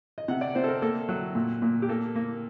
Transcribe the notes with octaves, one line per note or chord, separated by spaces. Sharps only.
D#5
C3 F#5
D5
C3 C5
A4
A#4
A#3 A4
F#3
A#2
A#2
G4
A#3 A4
A#3